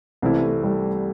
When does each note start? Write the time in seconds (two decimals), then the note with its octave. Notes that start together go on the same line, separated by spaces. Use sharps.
0.22 C2 C3 E3 A3 C4 E4
0.42 A3
0.63 G3